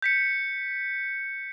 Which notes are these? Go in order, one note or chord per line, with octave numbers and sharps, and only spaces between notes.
G6 B6 C#7